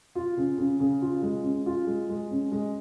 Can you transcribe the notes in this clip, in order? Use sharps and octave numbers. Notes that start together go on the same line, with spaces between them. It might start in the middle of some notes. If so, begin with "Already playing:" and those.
F4
C#3
C#3
C#3
F4
G#3
C#4
F4
G#3
G#3
C#4
G#3